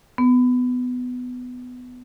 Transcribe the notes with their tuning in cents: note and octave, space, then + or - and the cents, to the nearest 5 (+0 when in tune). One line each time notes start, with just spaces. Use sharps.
B3 +15